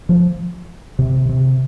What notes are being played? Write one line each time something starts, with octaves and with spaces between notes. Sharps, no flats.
F3
C3
C3